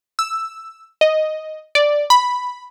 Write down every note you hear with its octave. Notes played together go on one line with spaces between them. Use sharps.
E6
D#5
D5
B5